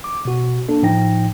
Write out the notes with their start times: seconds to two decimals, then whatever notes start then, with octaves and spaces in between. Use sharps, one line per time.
0.04 D6
0.25 B2 F#4
0.69 A#3 D4 A4
0.82 A2 F3 D#4 G5 A#6